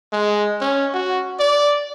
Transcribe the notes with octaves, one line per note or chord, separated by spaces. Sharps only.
G#3
C#4
F#4
D5